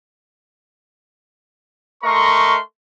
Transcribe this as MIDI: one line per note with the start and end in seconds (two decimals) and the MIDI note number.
2.04 2.57 57
2.04 2.57 70
2.04 2.57 75
2.04 2.57 82
2.04 2.57 84
2.04 2.57 85